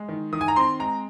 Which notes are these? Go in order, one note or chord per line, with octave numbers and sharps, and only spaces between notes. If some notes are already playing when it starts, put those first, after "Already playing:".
Already playing: G#3
D#3
D#3 D#6
G#5
A#5
C4 C6
G#3 A#5